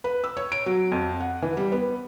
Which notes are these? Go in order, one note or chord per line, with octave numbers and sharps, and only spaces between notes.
B4
E6
C#5
D7
F#3
F2
F#5
E3
G3
B3